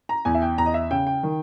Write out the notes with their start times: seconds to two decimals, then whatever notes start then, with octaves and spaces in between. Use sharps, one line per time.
0.09 A#5
0.25 E2 G#5
0.35 E5
0.42 G5
0.58 E2 A#5
0.66 D#5
0.74 E5
0.91 C#3 G5
1.07 G5
1.23 D#3